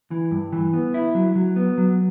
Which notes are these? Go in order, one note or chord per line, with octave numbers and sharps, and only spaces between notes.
E3
G2
E3
B3
E4
F#3
F#3
B3
F#3